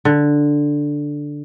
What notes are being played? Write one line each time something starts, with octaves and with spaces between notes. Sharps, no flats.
D3